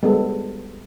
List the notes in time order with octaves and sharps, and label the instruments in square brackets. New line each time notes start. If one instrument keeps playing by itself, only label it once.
[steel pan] G3 G#3 B3 A4